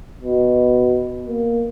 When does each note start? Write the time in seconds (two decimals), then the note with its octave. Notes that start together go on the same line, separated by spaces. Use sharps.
0.21 B2
1.27 A#3